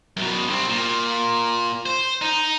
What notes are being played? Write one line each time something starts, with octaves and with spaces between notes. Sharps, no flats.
F#2 B2
C2 C4
A#2
C5
D#4